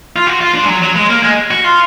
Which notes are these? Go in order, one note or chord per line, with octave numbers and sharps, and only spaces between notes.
F4
F#4
F4
D4
G#3
F#3
F#3
G#3
A#3
G#3
F#4
F4